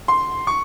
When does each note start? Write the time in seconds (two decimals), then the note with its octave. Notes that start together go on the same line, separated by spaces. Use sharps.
0.08 C6
0.47 C#6